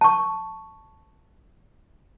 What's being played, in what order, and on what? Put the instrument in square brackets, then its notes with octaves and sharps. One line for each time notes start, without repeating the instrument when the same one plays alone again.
[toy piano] A5 C#6